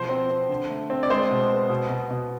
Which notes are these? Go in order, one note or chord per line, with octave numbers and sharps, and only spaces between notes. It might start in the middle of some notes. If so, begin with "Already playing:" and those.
Already playing: B2 F3 C5
C4
C4
D3
A3
C4
D5
G#3 C5
B2
B3
B2
B2
B2